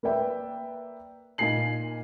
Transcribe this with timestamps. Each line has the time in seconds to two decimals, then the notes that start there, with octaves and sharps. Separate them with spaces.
0.03 A#3 B4 D5 E5 G5
1.38 A#2 D#4 G#5 C7 F#7